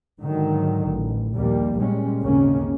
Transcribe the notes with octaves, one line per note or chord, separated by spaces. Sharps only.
G#2 D3 D#3 F#3
A1
A#1 D#2 G3 A#3
A#2 G3 G#3 C#4
G#1 D#2 C#3 A#3 C#4